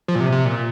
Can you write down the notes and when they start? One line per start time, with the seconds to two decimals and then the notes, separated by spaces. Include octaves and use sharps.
0.08 F3
0.15 A#2
0.20 C3
0.32 C3
0.45 A#2